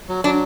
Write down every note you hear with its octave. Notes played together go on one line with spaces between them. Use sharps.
F#3
F#3 D4